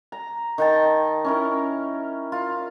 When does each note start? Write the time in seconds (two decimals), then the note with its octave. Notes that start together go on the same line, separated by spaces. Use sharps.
0.12 A#5
0.58 D#3 G5 A5
1.25 C#4 E4 A#4
2.32 F4